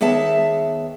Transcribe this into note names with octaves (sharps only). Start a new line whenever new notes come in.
D#2 B3 G#4 E5 A5